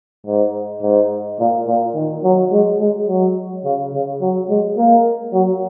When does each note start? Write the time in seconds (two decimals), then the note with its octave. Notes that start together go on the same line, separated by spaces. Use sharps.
0.27 G#2
0.83 G#2
1.39 A#2
1.67 A#2
1.95 D#3
2.24 F#3
2.52 G#3
2.80 G#3
3.08 F#3
3.65 C#3
3.93 C#3
4.21 F#3
4.49 G#3
4.77 A#3
5.33 F#3